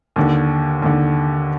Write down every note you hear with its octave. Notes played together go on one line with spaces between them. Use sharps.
D#2 D3
D#2 D3